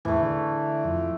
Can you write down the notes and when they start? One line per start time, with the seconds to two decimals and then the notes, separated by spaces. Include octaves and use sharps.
0.05 E2 A2 E3 A3
0.20 D3
0.84 F2